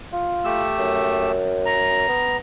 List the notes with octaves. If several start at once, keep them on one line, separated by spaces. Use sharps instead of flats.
F4
A3 G4 E6
F#2
A#5
B3